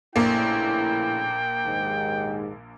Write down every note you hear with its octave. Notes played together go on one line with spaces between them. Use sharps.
A#1 A2 C#3 A#3 E4 G5
D#2 G#2